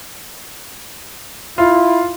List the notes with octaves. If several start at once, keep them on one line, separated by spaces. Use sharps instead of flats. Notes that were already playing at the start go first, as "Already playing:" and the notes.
E4 F4